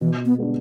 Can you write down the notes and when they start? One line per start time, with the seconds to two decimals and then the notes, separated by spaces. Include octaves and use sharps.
0.01 B2 E3
0.25 B3
0.38 G#3 B3 D4